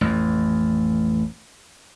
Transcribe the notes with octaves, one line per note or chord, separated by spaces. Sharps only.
A1 F2